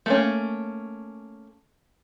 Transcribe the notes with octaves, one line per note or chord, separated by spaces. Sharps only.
A3 A#3 C#4